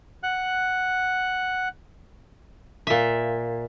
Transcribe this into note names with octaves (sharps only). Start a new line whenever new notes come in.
F#5 F#6
A#2 E5